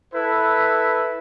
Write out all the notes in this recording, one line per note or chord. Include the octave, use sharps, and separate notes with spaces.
E4 A4 B4